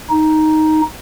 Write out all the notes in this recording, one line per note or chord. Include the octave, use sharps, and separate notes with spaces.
D#4